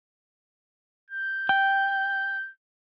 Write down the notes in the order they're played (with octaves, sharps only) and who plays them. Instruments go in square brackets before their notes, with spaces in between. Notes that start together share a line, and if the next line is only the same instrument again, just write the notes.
[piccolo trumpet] G6
[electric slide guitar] G5